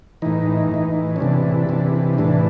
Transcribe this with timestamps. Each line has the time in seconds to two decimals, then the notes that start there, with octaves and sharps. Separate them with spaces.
0.22 A2 E3 D#4
0.71 A2 E3
1.16 C#4
1.20 C3 E3 D4
1.69 C3 E3
2.18 A2 E3 D4